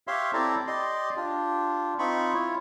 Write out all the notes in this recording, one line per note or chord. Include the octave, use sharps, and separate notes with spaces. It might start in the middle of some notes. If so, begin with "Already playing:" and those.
G4 C#5 E5 F5 C6
C4 E4 G4 A4 D5 A#5
G4 D5 D#5 C6
D4 F4 G4
C4 D#4 F4 B5 C#6
E4 F4 C#5